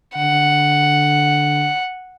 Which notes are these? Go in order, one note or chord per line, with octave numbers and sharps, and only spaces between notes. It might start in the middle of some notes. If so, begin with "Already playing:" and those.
D3 F#5